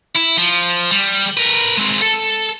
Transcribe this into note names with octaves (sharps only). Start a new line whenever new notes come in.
E4
F3
G3
A#4 B4
G#3 C4
A4